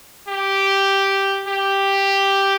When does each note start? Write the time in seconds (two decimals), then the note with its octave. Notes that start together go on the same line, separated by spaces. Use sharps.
0.28 G4
1.48 G4